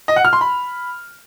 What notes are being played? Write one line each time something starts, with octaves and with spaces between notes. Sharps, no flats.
D#5
F#5
F6
C6
B5